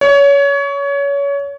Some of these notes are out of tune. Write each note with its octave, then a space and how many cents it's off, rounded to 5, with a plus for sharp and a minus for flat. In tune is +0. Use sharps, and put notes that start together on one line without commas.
C#5 +25